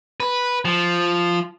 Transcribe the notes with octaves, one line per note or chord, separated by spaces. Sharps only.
B4
F3